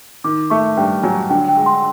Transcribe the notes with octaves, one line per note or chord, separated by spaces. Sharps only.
D#3 D6
A3 C#6
G2 G5
F#3 G#5
D3 G5
G5
G#3
C6